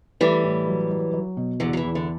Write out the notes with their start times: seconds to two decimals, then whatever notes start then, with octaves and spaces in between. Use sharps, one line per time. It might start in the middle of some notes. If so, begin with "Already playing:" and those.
0.21 E3 G3 A3
0.44 A2
0.67 F#3
0.91 F#3
1.14 F#3
1.37 B2
1.60 E2 D3 F#3
1.73 F#3
1.77 E3
1.83 E2
1.95 D3